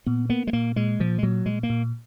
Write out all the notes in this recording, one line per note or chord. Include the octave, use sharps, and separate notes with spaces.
A#2 B3
A#3 B3
G#3
A#2 A#3
A#2 G#3
A#2 F3
G#3
A#2 F#3
A#2 G#3
A#3
A#2